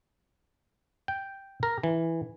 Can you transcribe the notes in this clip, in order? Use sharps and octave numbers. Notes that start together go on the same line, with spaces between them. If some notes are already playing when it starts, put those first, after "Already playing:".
G5
A#4
E3